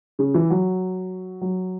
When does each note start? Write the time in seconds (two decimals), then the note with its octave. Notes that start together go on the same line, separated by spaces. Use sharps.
0.19 C#3
0.34 E3
0.50 F#3
1.41 F#3